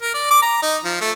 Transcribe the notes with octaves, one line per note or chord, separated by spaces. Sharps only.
A#4
D5
D6
A#5
D#4
F3
A3